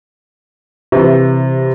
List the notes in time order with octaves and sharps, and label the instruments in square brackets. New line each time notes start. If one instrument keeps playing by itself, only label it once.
[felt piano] C3 E3